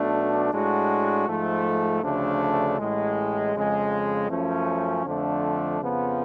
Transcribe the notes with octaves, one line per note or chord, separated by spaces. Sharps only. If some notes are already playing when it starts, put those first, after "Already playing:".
Already playing: B1 B2 A3 D4
A2 G#3 D4 F#4
G#2 F3 A3
D2 C#3 F3 A3 D4
A1 A2 G#3
F2 C#3 G#3
F#2 F3 A3 C#4
F2 D3 F3 A3 D4
F2 C#3 F3 B3